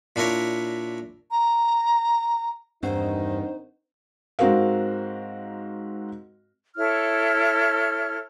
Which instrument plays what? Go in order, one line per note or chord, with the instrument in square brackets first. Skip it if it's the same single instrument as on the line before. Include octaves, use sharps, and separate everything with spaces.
[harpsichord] A#2 D4 E4 A#4 C#5
[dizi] A#5
[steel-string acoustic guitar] E2 G2 [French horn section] D#3 D#4 [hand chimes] C4 D4 F#5 [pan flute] C5
[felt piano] G#2 C4 F#4 A#4 F5
[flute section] E4 A4 C#5 F6